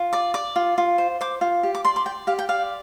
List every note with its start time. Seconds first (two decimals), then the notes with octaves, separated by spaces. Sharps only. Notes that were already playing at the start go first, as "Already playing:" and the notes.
Already playing: F4
0.13 D5 D6
0.34 D5 D6
0.56 F4
0.78 F4
0.98 C5
1.21 C5 D6
1.41 F4
1.63 G4
1.75 D6
1.85 D5 C6
1.96 C6
2.06 D5 G5
2.27 G4 F5
2.39 G5
2.49 D5 F5